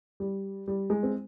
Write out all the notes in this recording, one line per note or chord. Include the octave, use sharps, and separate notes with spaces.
G3
G3
G#3
C4